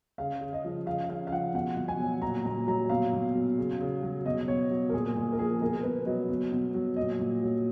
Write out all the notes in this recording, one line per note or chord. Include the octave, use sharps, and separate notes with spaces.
C#3 F5
C#3
D#5
F3
C#3 F5
C#3 F5
F5
F3 F#5
B2 F#5
B2
G#5
F#3
A#2 A#5
A#2 A#5
F#3 A#5
B2 F5
B2
F#3
C#3
C#3
F#3
B2 D#5
B2 C#5
F#3
A#4
A#2 G#4
A#2 G#4
A#4
F3 G#4
B2 A#4
B2 B4
F#3 D#5
B2
B2
F#3
A#2 D#5
A#2
F#3